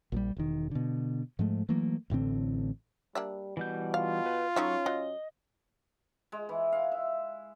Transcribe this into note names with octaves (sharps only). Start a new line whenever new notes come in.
A#1 F3 G3
E1 D#3
B2 D3
G#2 F3 G#3 A3
E3 F#3 A3 A#3
A1 A2 D3 C4
G3 A#3 D4 E5
B2 E3 G3 G6
F4 F5
B4
F#3 A3 C#4 D#4 E5 C#6
F#3 D#5
G#3
E3
F5
E5